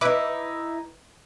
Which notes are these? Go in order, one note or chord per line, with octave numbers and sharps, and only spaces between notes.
D#4 E4 B4 D6